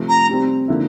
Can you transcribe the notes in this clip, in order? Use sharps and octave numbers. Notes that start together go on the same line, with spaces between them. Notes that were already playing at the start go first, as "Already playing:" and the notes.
Already playing: C3 F3 A3
A#5
C3 G3 C4
D3 F3 A#3 E4